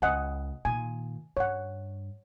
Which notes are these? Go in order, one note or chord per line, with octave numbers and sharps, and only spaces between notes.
C#2 D#5 F#5 G#5
A#2 D#3 G#5
G2 C#5 F#5